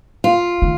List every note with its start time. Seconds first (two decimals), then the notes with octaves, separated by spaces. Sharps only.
0.24 F4
0.62 D#3